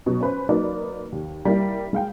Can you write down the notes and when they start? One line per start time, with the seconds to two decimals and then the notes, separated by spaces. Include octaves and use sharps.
0.06 B2 F#3
0.21 C#4 B4 C5
0.49 F#3 A#3 D#4 B4 D5
1.12 D#2
1.45 G3 A#3 E4
1.93 G#3 F5 G5